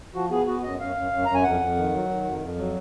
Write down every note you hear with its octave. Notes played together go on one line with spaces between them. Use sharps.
F3 F#4
B3 G#4
B3 F#4
F#2 D#5
F#2 F5
F#2
F#2
F#2 A#5
G#5
F2 F#5
F2
D#3
F#3
D#3
F2
F2
F#3